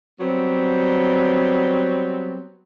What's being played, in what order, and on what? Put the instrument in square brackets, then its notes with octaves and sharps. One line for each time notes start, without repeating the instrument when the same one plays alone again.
[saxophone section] F#3 G3 B3 C4